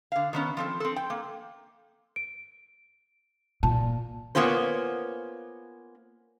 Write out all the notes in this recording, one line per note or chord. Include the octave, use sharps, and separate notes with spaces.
D3 F5
D#3 B3 C#4
F3 C4 A4
C4 A4
G5
A#3
D7
A#2 A5
A#3 B3 C#4 F4 C5